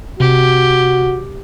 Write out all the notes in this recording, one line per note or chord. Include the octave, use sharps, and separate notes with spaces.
C3 F#4 G4